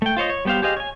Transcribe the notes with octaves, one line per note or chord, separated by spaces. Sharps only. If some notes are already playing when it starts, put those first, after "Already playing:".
A3 G5
F4 C5 C#5 D#5
C#5
G3 B3 G4 C5 F5
G4 G#4 C5 D#5 F5
C#5 G#5